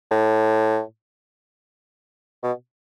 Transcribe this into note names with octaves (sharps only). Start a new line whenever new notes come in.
A2
B2